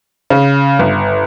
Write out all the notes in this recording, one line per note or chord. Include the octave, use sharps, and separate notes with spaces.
C#3
G1